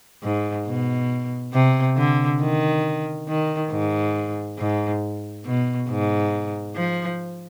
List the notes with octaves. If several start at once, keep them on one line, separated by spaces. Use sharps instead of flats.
G#2
B2
C3
D3
D#3
D#3
G#2
G#2
B2
G#2
F3